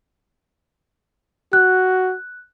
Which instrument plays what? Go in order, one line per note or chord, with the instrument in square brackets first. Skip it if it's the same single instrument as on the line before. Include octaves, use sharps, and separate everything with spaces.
[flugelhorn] F#4 [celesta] F#6